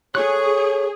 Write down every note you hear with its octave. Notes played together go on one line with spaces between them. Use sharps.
G#4 A4 C#5 C#6 F#6